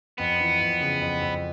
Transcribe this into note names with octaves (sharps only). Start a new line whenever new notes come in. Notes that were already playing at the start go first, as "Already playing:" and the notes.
F2 B3
E3
F2
C#3
F2
F2